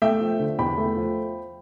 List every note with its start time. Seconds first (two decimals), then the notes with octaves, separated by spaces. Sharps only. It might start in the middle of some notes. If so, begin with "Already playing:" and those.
0.02 A3 E5 G5
0.21 F3
0.39 D3
0.59 E2 G5 B5
0.78 A3
0.96 F3